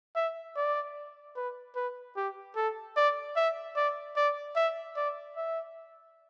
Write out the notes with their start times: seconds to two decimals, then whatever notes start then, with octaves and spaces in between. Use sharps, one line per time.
0.16 E5
0.56 D5
1.36 B4
1.76 B4
2.16 G4
2.56 A4
2.97 D5
3.36 E5
3.76 D5
4.16 D5
4.56 E5
4.96 D5
5.36 E5